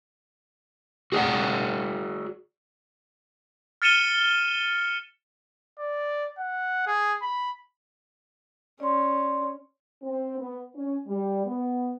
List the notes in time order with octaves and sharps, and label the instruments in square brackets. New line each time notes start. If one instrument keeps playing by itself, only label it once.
[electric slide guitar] F#4 G#4 B4 D5 F#5
[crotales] F6 A6 C#7 D#7 E7 G7
[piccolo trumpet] D5
F#5
G#4
B5
[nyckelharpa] C#4 [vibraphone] D5 C6
[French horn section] C4
B3
C#4
G3
B3